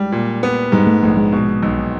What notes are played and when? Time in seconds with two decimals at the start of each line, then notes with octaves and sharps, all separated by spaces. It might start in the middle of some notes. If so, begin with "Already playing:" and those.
Already playing: G3 G#3
0.12 A#2
0.43 B3
0.72 G#2 G3
0.87 A3
1.03 A#1 A3
1.17 G#3
1.32 B2
1.63 B1